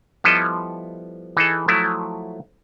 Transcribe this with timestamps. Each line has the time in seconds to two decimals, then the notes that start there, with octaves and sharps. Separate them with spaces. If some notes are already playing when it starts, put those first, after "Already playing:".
0.24 F3 G3 B3 E4 A4 D#5
1.37 E3 D#4 G#4 A4
1.68 F3 F#3 A3 E4